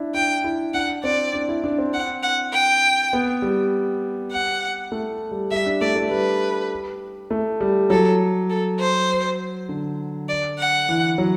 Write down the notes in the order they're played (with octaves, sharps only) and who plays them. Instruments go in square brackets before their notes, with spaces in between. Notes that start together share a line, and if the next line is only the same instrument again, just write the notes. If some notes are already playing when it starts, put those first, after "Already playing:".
Already playing: [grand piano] D4 E4
[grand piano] D4 [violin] G5
[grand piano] E4
[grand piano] D4 [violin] F#5
[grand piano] C4 [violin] D5
[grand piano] D4
E4
D4
C4
[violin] F#5
F#5
G5
[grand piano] B3
G3
[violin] F#5
[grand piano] A3
G3
[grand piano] G3 [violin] E5
[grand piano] D4
[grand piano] A3 [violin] D5
[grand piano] A3
[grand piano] G3 [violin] B4
[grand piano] A3
G3
[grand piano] F#3 [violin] A4
[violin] A4
C5
[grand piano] D3
[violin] D5
F#5
[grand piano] E3
F#3